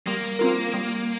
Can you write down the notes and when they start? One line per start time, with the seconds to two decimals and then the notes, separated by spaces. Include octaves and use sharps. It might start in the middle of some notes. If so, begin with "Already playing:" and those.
0.07 G3 A#3
0.39 C4 F4 A#4
0.73 G3